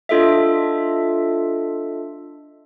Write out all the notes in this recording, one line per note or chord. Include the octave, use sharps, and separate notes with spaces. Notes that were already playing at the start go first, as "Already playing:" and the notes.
D4 F4 A4 D#5 E5